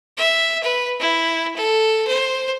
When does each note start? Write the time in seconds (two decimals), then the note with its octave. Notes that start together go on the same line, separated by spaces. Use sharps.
0.17 E5
0.63 B4
1.00 E4
1.56 A4
2.07 C5